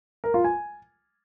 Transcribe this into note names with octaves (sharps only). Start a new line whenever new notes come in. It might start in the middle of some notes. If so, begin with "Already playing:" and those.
A#4
F4
G#5